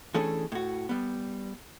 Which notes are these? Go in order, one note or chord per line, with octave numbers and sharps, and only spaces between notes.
E3 A3 C#4 D4 G#4 A4
A2 F#4
G3 B3